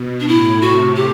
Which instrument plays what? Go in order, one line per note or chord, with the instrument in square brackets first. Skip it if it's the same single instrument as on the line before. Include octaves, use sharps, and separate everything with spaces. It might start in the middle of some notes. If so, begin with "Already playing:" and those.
Already playing: [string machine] B2
[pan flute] D4
[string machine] A2 [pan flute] E4
[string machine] C3 [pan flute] F#4
[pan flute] G4